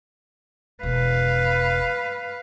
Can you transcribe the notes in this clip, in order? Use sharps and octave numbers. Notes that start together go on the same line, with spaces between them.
E1 B4 F5